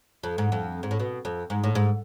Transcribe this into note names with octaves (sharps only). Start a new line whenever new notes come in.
F2
G#2
F2
G#2
A2
B2
F2
G#2
A2
G#2